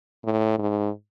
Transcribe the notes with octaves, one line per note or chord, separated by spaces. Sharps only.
A2
G#2